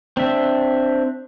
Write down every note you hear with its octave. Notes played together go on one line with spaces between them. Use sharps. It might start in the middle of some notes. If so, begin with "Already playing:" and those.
C4 D4 E5